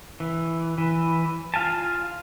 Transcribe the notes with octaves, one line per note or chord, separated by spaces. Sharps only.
E3
E3
F4 F5 G#5 A5